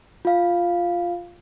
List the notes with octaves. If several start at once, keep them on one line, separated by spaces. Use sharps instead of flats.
F4 F5